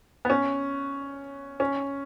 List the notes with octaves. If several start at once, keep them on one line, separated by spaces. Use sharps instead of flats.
B3
C#4
C#4